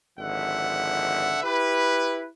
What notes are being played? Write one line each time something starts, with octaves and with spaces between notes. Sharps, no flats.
G#1 D3 F3 E5 F#5
E4 G4 B4